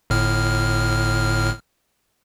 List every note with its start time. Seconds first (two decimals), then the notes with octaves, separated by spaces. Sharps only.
0.10 G1 A2 F6